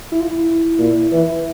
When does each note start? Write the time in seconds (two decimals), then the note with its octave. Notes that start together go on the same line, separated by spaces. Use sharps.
0.12 E4
0.21 F4
0.29 E4
0.79 A#2
1.12 E3